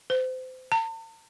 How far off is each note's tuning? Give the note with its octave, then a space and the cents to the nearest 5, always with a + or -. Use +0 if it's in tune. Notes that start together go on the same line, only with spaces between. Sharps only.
C5 -30
A5 +45